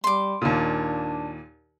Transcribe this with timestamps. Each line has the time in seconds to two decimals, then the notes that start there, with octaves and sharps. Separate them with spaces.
0.04 G3 C6 D6
0.42 D#2 A#2 D4